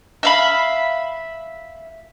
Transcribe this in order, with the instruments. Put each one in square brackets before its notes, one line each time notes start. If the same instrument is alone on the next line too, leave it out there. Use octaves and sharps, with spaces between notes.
[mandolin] E5 F5 B5